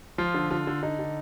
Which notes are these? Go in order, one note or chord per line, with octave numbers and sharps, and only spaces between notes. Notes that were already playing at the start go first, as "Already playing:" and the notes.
F3 F4
D3
D3 F4
D3
D3 D#4
D3